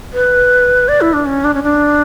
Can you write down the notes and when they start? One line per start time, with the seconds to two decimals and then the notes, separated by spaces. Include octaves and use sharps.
0.14 B4
0.88 D5
1.01 E4
1.13 D4
1.26 C#4
1.44 D4
1.54 C#4
1.63 D4